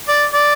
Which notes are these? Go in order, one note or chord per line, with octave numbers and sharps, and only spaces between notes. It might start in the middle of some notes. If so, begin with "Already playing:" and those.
D5
D5